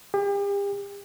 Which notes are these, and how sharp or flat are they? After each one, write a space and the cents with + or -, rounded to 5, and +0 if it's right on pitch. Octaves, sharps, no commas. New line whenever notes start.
G4 +40